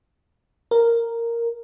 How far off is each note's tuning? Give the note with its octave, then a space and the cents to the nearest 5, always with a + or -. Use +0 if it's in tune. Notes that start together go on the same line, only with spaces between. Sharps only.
A#4 -5